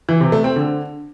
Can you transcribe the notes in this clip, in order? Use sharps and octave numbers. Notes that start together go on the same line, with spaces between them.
E3
C3
A3
C4
D3